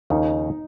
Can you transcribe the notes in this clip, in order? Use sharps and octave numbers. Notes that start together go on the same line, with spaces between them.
D#2 C#3 F3 D#4